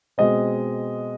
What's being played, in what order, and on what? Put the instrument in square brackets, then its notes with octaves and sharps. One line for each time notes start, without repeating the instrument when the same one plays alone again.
[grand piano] B2 G#3 C4 D#5